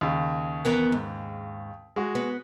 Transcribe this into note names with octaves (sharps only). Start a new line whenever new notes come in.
D#2 C#3
E3 B3 A#4
G#2
G#3 F#4
B3